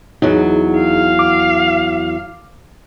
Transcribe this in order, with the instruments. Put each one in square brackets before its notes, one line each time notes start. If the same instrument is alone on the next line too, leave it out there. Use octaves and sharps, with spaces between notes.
[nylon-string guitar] E2 F#3 [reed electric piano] D#4 G#4
[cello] F5
[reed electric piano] D6